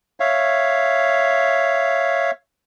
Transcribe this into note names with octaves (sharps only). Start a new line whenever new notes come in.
C#5 E5 F5